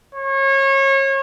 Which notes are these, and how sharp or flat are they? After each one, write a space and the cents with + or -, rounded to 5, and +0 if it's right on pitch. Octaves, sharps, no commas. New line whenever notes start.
C#5 -30